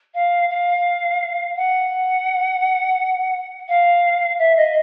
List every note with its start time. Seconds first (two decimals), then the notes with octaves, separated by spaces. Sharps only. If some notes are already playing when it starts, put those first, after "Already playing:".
0.14 F5
0.49 F5
1.56 F#5
3.68 F5
4.39 E5
4.56 D#5